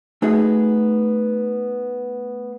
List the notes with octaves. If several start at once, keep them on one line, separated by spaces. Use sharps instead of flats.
A3 B3 D#4 F#4 G#4